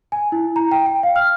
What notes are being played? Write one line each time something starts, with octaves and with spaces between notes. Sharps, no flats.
G#5
E4
A#5
G5
G5
F5
F6